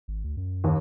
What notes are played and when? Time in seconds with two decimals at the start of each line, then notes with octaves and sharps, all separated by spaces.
0.08 G#1
0.24 D2
0.37 F#2
0.64 D#2